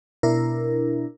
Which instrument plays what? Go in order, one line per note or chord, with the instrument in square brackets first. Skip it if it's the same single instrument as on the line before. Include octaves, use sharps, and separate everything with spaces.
[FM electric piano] B2 D4 E4 A#4